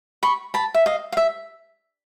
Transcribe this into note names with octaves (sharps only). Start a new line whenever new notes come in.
B5 C#6
A5 B5
E5
D#5 F5
F5
E5